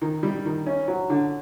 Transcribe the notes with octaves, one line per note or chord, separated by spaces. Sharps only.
D#3
G3
D#3
C#4
F#3
D3